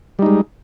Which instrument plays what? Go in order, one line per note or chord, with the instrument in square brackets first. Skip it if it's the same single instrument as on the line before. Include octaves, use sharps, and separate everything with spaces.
[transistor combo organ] G3
D#4
G#3